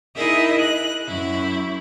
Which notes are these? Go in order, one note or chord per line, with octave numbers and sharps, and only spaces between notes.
D#4 E4 G#4 A#4 D#5 E5
F#6
F#2 E4